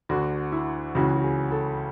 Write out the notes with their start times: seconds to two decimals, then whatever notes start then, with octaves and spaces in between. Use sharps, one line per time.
0.09 D2 D3 F#4
0.52 E4
0.95 C#2 C#3 E3 F#4
1.17 F#4
1.24 G#4
1.52 A4